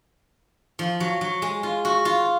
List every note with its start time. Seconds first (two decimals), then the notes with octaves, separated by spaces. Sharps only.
0.79 F3
1.00 F#3
1.21 F#3
1.42 G#3
1.63 F4
1.85 F#4
2.05 F4